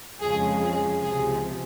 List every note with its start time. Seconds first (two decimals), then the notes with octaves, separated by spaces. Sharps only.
0.21 F2 C#3 F3 G#3 G#4
0.62 G#4
1.02 C#2 C3 F3 G#4